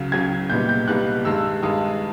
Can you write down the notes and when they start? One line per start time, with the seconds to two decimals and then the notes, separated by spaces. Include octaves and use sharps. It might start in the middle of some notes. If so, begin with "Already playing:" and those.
Already playing: C#2 C#3 F#3
0.12 C#2 C#3 F#3 G#6
0.50 C2 A#2 G3 B3 D#4 G6
0.69 G6
0.88 C2 A#2 G3 B3 D#4 F#6
1.25 G2 D#3 G#3 E6
1.63 G2 D#3 G#3 D#6